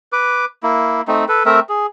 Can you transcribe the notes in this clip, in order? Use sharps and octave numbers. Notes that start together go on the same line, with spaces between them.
B4 D6
A#3 E4
A3 C4 D#4
A4 B4
A3 C4 A#4 E5
G#4